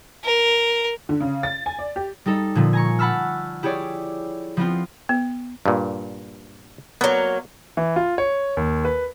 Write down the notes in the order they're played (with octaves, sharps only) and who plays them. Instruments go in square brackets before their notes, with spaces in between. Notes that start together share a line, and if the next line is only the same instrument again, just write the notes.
[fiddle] A#4
[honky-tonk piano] D3
C#3
A6
G#5
D5
G4
[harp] G3 D#4 A4
A#2 D3 F3
G#5 A#5 C#6
F#5 A5 B5 E6 F6
E4 G4 G#4 C#5 D5
F3 B3 C4 F4
[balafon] B3
[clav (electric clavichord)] G2 A#2
[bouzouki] F#3 A#3 [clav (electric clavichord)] B3
[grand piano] E3
F4
C#5
D#2
B4